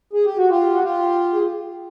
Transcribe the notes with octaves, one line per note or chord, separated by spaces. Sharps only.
G#4
G4
F#4
F4 G4
F#4
F4 G4
G#4